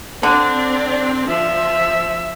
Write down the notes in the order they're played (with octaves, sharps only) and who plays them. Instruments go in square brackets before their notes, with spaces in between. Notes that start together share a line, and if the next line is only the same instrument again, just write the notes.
[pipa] D3 [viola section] C4 D4
[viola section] F3 [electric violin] E5